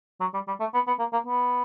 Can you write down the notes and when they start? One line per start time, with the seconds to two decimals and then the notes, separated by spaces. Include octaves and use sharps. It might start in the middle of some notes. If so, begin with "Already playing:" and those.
0.21 F#3
0.34 G3
0.47 G3
0.60 A3
0.74 B3
0.87 B3
0.99 A#3
1.13 A#3
1.26 B3